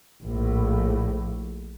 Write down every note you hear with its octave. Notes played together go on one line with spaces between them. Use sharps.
A#1 A2